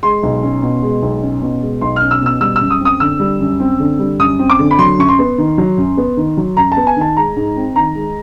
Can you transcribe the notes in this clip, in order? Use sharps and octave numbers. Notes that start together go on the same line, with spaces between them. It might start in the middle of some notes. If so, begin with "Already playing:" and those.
G#3 C6
B1
C#4
B2
G#3
B1
C#4
B2
G#3
B1 C6
F6
C#4
E6
B2 E6
G3 E6
E6
F#2
D#6
C4
D#6
D3 E6
G3
F#2
C4
D3
G3
F#2 D#6
C4
D6
D3
B5
F#3 C6
F#2 C#6
C6
B3
D#3
F#3
F#2
B3
D#3
F#3
F#2 A#5
A5
B3
G#5
D#3 A5
G#3 A#5
G#2
C4
D#3 A#5
G#3